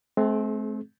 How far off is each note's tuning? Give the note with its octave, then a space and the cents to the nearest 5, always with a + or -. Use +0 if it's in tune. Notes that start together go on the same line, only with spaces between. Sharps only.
A3 -40 C4 +0 G#4 +30